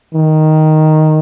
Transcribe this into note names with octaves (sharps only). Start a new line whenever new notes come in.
D#3